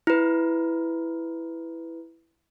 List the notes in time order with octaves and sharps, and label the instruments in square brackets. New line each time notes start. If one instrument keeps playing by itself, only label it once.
[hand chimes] E4 B4